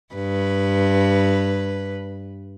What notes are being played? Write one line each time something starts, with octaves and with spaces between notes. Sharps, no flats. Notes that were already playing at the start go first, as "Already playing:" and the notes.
G2 B4